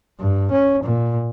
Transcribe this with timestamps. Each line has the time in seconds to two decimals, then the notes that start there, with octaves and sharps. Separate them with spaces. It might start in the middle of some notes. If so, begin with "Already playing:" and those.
0.20 G2
0.52 C#4
0.84 A#2